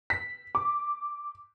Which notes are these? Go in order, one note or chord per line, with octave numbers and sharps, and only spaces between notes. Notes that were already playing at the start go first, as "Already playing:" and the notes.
B6
D6